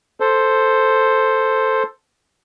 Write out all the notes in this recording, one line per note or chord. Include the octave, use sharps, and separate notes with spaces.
A4 C5